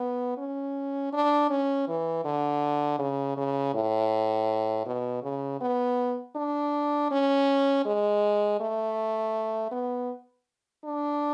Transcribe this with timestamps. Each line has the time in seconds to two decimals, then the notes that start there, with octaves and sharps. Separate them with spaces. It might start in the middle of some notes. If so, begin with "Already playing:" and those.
Already playing: B3
0.37 C#4
1.13 D4
1.50 C#4
1.88 E3
2.25 D3
2.99 C#3
3.37 C#3
3.74 A2
4.86 B2
5.23 C#3
5.61 B3
6.36 D4
7.11 C#4
7.85 G#3
8.60 A3
9.71 B3
10.85 D4